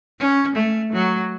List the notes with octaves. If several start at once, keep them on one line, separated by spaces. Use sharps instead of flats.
C#4
A3
F#3